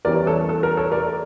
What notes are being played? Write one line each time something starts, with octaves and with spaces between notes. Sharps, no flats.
E2 E3 G3 C#4 A#4 D5
A4 C#5
A4
A#4
A4 C#5
A#4 D5